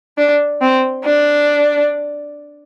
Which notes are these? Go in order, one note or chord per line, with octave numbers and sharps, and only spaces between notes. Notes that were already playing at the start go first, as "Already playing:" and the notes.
D4
C4
D4